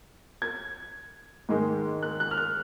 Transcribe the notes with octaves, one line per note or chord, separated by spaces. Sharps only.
G#6
G#2 D#3 G#3
F#6
F#6
F6
F#6